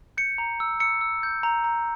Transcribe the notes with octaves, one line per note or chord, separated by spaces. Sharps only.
G6 C#7
A#5
E6
E6 C#7
E6
G6
A#5
A#5